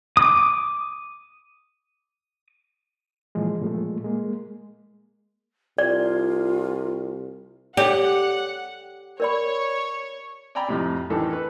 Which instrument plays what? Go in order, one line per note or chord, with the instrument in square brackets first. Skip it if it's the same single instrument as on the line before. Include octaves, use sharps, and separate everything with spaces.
[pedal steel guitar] D6 D#6
[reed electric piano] A#2 E3 F3 G#3
A#2 F3 G#3 A3
G#3 A#3
[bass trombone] C2 [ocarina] F4 [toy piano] D5
[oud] G4 [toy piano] A4 C#5 D5 [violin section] F#5
[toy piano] A#4 D5 B5 [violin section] C#5
[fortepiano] D5 G5 G#5 A#5 B5
F2 A2 C3
A1 D#3 E3 A3 D4 A4
B4